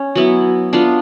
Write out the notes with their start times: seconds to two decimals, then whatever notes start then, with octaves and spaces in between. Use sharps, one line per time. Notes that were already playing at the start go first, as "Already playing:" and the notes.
Already playing: C#4 C#5
0.16 F#3 B3 E4
0.73 B3 D4 F4